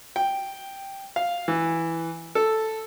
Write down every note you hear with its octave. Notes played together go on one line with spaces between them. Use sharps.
G5
F5
E3
A4